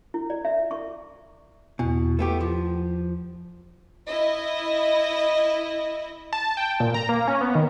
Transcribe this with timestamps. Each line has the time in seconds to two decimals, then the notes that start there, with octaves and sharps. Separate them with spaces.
0.14 E4
0.30 D5
0.45 E5
0.71 C#6
1.79 E2 B2
2.19 A3 B3 G4
2.41 F3
4.08 E4 D#5
6.33 A5
6.57 G5
6.80 A#2
6.94 A#5
7.09 A#3
7.28 C#4
7.41 B3
7.55 D#3